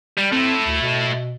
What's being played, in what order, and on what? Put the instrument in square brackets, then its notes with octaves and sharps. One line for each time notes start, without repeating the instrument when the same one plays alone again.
[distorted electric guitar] G3
[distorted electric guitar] A3 E4 [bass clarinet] C4
[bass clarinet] D2
B2